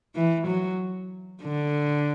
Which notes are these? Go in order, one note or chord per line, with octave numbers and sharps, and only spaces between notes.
E3
F#3
D3